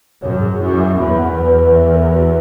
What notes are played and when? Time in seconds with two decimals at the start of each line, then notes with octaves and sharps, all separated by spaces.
0.22 F#2 C#5
0.41 G#4
0.60 F#2 E4
0.79 E5
0.98 E2 B5
1.18 F#5
1.37 B4
1.56 B4
1.76 E5
1.95 A#4
2.14 F#4